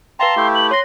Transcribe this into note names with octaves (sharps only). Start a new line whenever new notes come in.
B4 F5 G5 A5 A#5 C6
A3 E4 G4
F#7
C#5 C6 A#6